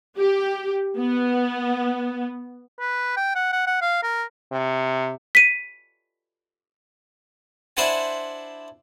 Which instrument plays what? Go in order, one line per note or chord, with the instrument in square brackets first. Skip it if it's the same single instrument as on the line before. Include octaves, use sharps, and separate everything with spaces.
[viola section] G4
B3
[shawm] B4
G5
F#5
F#5
F#5
F5
A#4
[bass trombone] C3
[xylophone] B6 D#7
[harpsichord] D4 E4 C5 E5 F#5 G#5